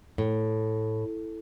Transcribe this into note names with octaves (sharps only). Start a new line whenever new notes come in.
A2